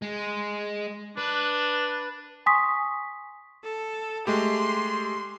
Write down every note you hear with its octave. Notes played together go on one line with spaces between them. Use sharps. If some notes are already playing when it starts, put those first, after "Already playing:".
G#3
D4 B4
G#5 C6 C#6 D#6 B6
A4
G#3 A3 G4 C6